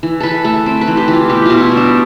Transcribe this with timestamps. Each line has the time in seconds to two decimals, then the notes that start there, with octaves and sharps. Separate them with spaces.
0.03 E3
0.20 E3 A4 B4
0.44 A3 A4
0.66 C4
0.81 B4
0.87 E3
0.97 G4
1.08 E3
1.13 F4
1.29 B2 G4
1.46 B2 F4
1.60 E4
1.71 G3
1.77 D4